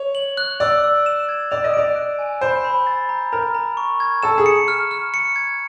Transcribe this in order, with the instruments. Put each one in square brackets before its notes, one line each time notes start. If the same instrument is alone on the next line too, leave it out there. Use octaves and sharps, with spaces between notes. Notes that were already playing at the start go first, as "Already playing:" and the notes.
Already playing: [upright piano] C#5
[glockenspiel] F#7
F#6
[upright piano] D5 [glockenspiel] E6
[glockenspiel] E6
E7
G#6
[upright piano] D5 [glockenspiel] F7
[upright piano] D#5
[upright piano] D5 [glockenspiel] D7
[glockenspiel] F#6
G#5
[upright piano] C5 [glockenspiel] B5
[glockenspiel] B5
A6
A#5
[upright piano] A#4 [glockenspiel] A#5
[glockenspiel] A#5
C#6
G#6
[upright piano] A4 [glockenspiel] E7
[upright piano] G#4
[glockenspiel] C#7
F6
F6
C#7
G#6